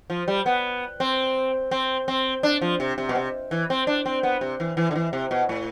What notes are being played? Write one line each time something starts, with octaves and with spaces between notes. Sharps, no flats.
F3
G3
B3
C4
C4
C4
D4
F3
C3
C3
B2
C3
E3
C4
D4
C4
B3
C3
E3
E3
D3
E3
C3
B2
A2